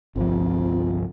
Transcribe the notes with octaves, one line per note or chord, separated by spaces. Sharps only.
G1 C2 F2 F3